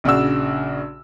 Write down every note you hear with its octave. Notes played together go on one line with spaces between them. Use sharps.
A#1 C#3 D4 F#4 E6